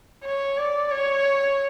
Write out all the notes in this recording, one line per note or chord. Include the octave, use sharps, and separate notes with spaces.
C#5
D5
C#5